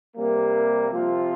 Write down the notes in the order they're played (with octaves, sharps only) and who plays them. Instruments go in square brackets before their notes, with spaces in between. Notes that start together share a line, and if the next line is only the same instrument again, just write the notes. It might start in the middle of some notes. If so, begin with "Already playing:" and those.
[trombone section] C3 G3 A#3
C3 F3 C4 F4